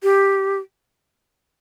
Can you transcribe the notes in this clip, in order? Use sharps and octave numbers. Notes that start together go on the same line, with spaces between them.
G4